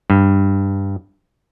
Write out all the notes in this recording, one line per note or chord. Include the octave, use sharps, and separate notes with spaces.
G2